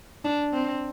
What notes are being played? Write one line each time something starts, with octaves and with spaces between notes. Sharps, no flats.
D4
C4